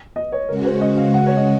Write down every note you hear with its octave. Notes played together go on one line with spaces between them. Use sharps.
D#5
C#5
C#3 G#3 C#4 F#4 A#4
C5
D#5
F5
F#5
C#5
D#5